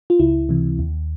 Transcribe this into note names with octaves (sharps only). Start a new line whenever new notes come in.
F4
C#2 E4
C3 E3
D#2